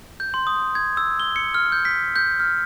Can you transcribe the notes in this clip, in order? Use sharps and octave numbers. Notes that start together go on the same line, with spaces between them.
G6
C6
D#6
G#6
E6
G7
C#7
F6
G6
B6
G6
F6